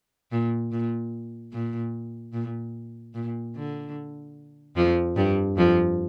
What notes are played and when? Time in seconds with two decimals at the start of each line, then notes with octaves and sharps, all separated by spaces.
0.32 A#2
0.72 A#2
1.53 A#2
2.33 A#2
3.14 A#2
3.55 D3
4.76 F2 F3
5.16 G2 G3
5.57 F2 F3